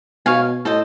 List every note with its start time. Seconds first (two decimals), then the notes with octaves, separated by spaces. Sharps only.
0.25 B2 C#5 F5 G#5
0.65 A2 A4 C5 D#5